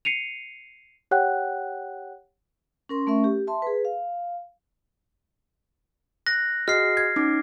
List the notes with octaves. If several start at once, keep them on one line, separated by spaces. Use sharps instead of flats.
C7 C#7 D#7 F7
G4 C#5 F#5 G5 F#6
C#4 A#4 C6
A3 C#4 A#4 E5 C#6
G4
E5 A5 C6
G#4 B4
F5
F#6 A#6
F#4 G#4 D#5 F6 C7
G#6
C#4 D#4 D6